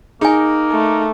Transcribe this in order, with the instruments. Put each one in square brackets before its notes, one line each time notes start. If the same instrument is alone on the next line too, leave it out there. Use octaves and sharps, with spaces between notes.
[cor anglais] A#3 [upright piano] D#4 [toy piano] G#4 G#5
[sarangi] A3